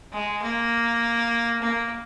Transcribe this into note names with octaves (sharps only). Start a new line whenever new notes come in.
G#3
A#3
A#3